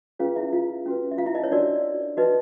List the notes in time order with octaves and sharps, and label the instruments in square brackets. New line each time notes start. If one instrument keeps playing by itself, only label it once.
[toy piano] C#4 F4 G#4 B4 F5
E4 E5
F4 F5
C#4 F#4 B4
E5
F4 F5
E4 E5
D#4 D#5
C#5
D4 F#4 A#4 D5
D#4 F#4 B4 D#5